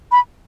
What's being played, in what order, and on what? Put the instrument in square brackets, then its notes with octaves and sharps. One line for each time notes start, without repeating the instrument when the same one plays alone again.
[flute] B5